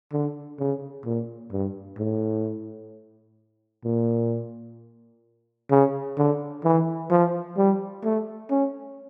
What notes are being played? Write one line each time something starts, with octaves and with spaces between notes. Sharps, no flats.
D3
C#3
A#2
G2
A2
A#2
C#3
D3
E3
F3
G3
A3
C#4